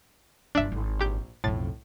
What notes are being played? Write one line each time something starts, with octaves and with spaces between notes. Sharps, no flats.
G1 G2 D4 E5
G#1
A#1 G4 G6
B1 F2 A2 A6